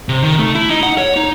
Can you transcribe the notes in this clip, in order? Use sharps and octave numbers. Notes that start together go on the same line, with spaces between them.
C3
D#3
A3
E4
D#4
F#5
C#5
D#4